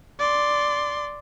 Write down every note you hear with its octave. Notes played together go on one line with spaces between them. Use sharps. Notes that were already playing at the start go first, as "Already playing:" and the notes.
D5 C6